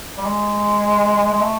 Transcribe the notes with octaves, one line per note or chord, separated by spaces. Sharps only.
G3
G#3
G#3
A3